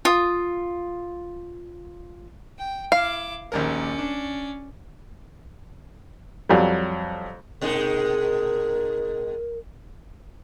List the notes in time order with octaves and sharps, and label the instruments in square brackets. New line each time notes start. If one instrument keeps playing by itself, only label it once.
[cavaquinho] F4 D#6
[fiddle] G5
[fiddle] E4 D6 [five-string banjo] F5
[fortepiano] A#1 D#2 A#4 [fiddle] C#4 D5
[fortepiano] D4
F2 F#3 G3
[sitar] B2 G#3 D#4 [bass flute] A#4